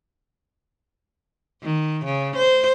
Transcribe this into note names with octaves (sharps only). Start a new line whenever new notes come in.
D#3
C#3
C5